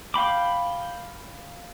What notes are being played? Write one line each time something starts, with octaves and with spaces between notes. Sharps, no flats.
F5 G5 B5 D6